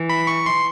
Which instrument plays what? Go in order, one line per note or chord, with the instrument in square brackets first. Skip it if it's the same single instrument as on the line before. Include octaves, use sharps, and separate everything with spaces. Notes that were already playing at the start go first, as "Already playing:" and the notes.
Already playing: [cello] E3
[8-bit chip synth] B5
C#6
C6